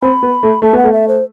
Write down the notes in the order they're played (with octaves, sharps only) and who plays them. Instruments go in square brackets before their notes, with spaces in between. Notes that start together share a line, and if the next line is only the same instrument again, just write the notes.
[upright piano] C4 [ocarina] B5
[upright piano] B3
A3
[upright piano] A3 [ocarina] A5
[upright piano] B3 [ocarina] F#5
[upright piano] A3
[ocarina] E5
C5